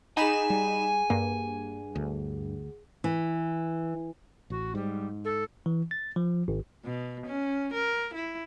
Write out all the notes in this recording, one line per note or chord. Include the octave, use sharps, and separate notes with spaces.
D#4 G#4 F#5 G#5 B5 E7
G3
G2 A#3
D2
E3
A1 F#4
G#2 G3
A4
E3
A6
F3
G#1
B2
C#4
A#4
E4